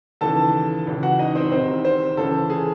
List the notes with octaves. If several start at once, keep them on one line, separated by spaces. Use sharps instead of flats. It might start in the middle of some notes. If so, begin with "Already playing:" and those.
D#2 C#3 E3 A4 A5
C#2 C#3 E3
F#4 F#5
D#4 D#5
C4 C5
C2 C3 D#3 C4 C5
C4 C5
C#2 C#3 E3 A4
G#4